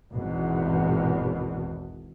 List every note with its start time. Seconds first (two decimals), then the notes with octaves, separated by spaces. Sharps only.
0.12 G#1 E2 B2